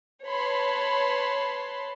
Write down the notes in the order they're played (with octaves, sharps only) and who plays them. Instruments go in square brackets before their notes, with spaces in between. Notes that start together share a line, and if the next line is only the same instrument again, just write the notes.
[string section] B4 C#5 A5 B5 C6